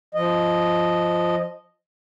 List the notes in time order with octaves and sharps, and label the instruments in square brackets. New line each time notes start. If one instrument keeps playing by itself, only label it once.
[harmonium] F3 D#5